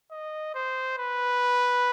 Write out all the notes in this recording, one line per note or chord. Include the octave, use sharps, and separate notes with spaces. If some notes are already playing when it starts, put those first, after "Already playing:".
D#5
C5
B4